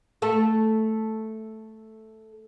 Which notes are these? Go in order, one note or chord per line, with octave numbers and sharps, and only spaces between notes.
A3 A4